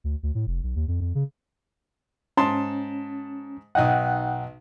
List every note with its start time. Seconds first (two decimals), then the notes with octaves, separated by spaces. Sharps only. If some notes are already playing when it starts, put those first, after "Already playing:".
0.04 D2
0.23 D2
0.35 A2
0.47 F1
0.63 B1
0.76 D#2
0.88 F2
1.00 F2
1.15 C#3
2.37 G#2 C#4 A5 C6
3.75 B1 D#4 D#5 F#5 G5 F#6